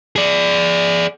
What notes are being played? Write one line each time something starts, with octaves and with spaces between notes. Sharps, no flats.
G#4 D5